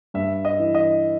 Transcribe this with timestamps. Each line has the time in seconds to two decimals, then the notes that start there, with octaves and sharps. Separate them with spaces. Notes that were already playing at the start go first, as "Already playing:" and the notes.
0.14 G2 E5
0.45 D#5
0.59 E3
0.75 D#5